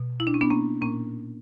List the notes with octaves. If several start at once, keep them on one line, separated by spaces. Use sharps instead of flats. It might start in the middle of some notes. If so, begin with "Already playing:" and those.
Already playing: B2
E4
D4
C#4
B3 D4
A#3 C#4
A#2 A#3 C#4